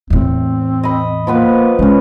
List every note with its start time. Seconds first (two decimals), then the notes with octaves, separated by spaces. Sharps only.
0.10 E2 A2 C4
0.83 D#5 B5
1.27 F3 A#3 B3 B4
1.79 C#3 G#3 C#4